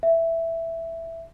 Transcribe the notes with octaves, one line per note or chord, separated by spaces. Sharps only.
E5